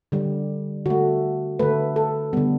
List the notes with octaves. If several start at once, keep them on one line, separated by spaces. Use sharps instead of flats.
D3 G3
D3 A3 F#4
D3 A3 B4
A4
D3 G3 B3